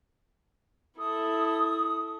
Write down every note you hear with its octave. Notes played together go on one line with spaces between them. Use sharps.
E4 A4 D#6